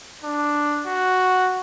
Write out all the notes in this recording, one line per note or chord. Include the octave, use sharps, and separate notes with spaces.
D4
F#4